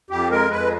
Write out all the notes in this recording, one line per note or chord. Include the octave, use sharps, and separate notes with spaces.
F2 G4
G#3 A#4
F2 B4